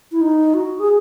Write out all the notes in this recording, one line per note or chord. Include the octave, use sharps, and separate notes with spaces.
E4
D#4
F#4
G#4